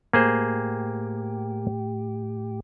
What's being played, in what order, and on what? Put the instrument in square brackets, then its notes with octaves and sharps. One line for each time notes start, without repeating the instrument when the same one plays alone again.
[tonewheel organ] A2 G4 [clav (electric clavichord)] A#3 G#4 C5